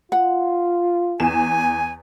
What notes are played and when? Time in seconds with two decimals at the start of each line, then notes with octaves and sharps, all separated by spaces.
0.12 F4 F#5
1.20 E2 G#5 E7